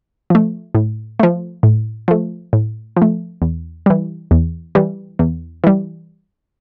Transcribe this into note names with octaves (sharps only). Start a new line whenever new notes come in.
F3 A3
A2
F3 A3
A2
F3 A3
A2
F3
A3
E2
E3 G3
E2
E3 G3
E2
E3 G3